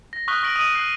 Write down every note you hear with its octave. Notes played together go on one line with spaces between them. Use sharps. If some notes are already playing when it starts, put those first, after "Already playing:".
A#6
C#6 D#6 F6 F#6 B6 G7
C#6 A#6 D7 F#7
D#6 A#6 D#7 F#7
F#6 C7 F#7